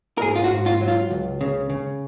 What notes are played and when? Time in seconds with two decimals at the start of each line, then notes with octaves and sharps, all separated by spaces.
0.18 A#4
0.21 G#2 G#4
0.36 F4
0.44 F#4
0.51 G#2
0.66 F4
0.81 F#3
0.88 F4
1.11 C#2
1.41 C#3
1.70 C#3